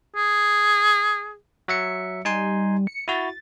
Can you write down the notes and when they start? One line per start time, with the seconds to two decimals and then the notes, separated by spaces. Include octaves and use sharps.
0.16 G#4
1.68 F#3 E5 C#7
2.25 G3 D#4 G#5 C6
2.87 C#7
3.08 E4 F#4 A6